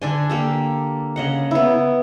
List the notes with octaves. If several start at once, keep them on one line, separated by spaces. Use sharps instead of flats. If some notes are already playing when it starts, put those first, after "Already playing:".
D3 D4 G#5
A#3 G4 A4
C#3 D#5 F#5
B3 E4